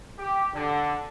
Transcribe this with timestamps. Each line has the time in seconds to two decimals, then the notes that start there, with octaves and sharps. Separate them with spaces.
0.19 G4
0.54 D3